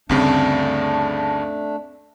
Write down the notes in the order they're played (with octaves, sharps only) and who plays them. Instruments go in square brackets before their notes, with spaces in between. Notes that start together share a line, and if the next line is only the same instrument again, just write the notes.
[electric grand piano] D2 G2 C#3 [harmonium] A3 D4 [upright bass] C4